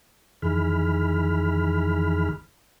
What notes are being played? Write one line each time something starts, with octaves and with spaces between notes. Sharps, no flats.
F2 D#3 E3 G#4 B5 F6